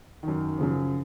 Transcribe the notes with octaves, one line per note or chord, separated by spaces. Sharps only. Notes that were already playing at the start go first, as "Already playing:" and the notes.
F#2 D#3
F#2 C#3 F3